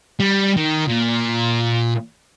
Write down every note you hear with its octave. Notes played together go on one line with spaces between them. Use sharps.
G3
D#3
A#2